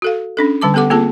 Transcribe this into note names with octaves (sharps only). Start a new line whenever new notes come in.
F#4 A4 F5
C#4 D4 A4
D3 G3 A5 D6
B3 G4 A4 F#5 D6
A#3 C4 F4 G#4 A4 A5